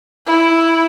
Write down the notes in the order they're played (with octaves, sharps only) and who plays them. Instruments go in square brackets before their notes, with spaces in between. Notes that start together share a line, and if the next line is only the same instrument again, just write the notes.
[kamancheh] E4